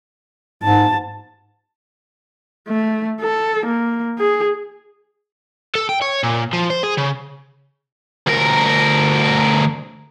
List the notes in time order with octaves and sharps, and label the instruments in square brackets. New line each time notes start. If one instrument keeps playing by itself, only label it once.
[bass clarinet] G#2 [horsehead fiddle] A5
[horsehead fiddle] A3
A4
A#3
G#4
[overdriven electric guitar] A4
G5
C#5
A#2
F3
C5
G#4
C#3
[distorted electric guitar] D2 A#4